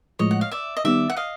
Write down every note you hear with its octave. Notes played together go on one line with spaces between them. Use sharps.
A2 F3 G#3 C#5 D#5
F#5
F5
D5 E5
D#5
D#3 G3 B3 D5 E5
F#5
D#5 F5